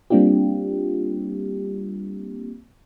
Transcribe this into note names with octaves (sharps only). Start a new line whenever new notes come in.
G3 A#3 C4 D4 F4 G4